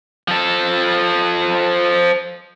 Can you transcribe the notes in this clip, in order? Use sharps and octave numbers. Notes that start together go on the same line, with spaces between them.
F3 A4